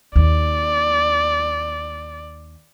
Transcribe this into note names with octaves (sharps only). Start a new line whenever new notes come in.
D#2 D5